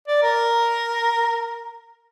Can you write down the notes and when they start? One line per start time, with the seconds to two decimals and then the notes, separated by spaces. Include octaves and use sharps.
0.08 D5
0.23 A#4